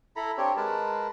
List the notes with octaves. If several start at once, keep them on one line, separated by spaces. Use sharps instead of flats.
E4 A4 A#5 B5
C4 D4 G4 C#5
G#3 A#4 B4 A5